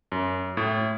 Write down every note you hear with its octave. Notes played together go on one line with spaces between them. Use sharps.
F#2
A2